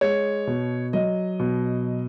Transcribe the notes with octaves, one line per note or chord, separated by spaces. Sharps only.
G#3 C#5
B2
F#3 D#5
B2